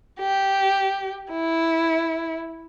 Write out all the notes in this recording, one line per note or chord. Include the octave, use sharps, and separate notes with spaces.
G4
E4